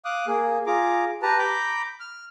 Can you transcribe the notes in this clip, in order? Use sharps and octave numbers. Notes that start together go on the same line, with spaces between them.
F5 D6 D#6 F#6
A#3 G#4
F4 G#4 A#5 D6
G4 B4 A5 A#5
A#5 B5 D6 G6
F6